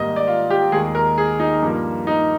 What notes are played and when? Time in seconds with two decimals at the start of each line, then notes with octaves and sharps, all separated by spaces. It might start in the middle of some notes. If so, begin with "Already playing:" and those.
Already playing: G#1 G#2 G3 A#3 D#5
0.16 D5
0.27 F4
0.50 G4
0.72 D#2 D#3 G#3 G#4
0.95 A#4
1.18 G#4
1.40 D#4
1.62 G2 F3 A#3
2.07 D#4